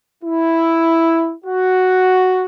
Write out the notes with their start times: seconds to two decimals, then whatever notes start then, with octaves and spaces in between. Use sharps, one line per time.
0.24 E4
1.45 F#4